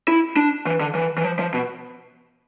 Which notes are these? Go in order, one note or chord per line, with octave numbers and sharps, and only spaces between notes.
E4
D4
E3
D3
E3
E3
F3
F3
B2